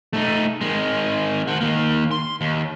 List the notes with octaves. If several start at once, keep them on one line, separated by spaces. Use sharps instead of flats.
A3 D#4
D#3 G#3
F#4 C5
D#3 A#3
C6
D#2